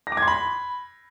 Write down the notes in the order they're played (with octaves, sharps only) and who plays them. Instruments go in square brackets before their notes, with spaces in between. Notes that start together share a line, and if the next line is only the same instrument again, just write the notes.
[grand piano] A#6
D6
G#6
C6
B5